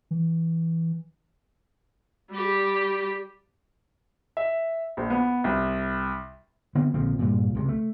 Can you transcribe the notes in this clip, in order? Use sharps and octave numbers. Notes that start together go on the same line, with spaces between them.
E3
G3 G4
E5
A#1
B3
C2
D3 B3 C4
A#1 D3 F3 C4
G2 A#2
C#2 C3
A3